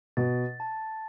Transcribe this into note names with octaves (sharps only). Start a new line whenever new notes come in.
B2 A6
A5